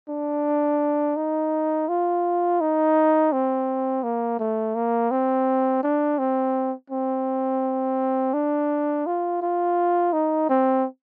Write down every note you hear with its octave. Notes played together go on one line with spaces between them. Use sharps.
D4
D#4
F4
D#4
C4
A#3
A3
A#3
C4
D4
C4
C4
D4
F4
F4
D#4
C4